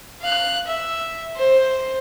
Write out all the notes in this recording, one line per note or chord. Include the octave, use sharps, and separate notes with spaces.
F5 F#6
E5
C5